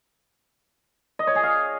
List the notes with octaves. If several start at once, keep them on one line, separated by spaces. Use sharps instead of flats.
D#5
C#5
G#4
F5